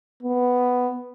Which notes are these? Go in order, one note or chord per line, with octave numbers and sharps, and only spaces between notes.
B3